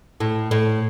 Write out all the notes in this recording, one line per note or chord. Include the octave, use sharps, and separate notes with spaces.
A2
A2